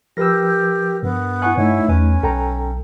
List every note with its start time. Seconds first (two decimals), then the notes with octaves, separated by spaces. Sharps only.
0.17 F3 G4 A#4 B4 E6 A#6
1.03 G2 B3
1.42 E4 F#5 G#5 C#6 F#6
1.57 G2 A3 D#4 E4 C#5 E5
1.89 E2 C#4 B4 G#5
2.23 B1 A4 G5 A#5